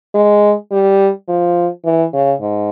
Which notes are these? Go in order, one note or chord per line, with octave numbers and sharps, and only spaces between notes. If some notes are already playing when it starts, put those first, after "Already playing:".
G#3
G3
F3
E3
C#3
G#2